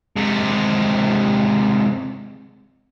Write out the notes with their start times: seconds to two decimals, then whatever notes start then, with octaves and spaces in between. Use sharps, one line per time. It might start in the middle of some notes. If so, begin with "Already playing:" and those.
0.17 C3 G#3